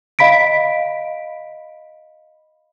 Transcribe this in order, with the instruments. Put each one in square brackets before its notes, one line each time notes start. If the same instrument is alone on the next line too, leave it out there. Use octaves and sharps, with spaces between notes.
[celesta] D#5 F5 B5 B6 D7